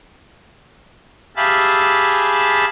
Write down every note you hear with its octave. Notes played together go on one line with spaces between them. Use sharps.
G4 G#4 E5 F5 A5 B5